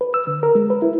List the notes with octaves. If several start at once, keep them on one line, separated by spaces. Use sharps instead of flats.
B4
E6
D3
A#4
G#3
B4
E4